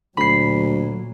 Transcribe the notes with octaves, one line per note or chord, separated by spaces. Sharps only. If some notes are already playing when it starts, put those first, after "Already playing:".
D2 A#2 F#3 B5 C7